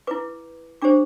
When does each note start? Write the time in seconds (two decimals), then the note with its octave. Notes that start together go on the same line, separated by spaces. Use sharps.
0.07 E4 B4 D6
0.82 D4 G4 C5 D6